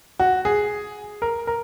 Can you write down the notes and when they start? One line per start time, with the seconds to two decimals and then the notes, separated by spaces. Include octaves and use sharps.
0.20 F#4
0.45 G#4
1.22 A#4
1.47 A#4